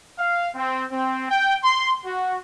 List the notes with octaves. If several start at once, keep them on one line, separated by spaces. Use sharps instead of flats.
F5
C4
C4
G5
C6
F#4